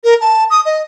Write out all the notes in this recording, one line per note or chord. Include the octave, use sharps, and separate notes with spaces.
A#4
A5
D#6
D#5